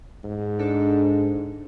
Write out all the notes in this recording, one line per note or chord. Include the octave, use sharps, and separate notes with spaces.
G#2
D4 A4